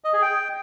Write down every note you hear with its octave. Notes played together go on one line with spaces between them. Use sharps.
D#5
G#4
G5